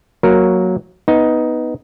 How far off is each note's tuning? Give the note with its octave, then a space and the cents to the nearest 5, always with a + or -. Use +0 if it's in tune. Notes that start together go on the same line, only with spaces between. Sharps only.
F#3 -5 A#3 +0 A#4 +0
B3 +0 D#4 +10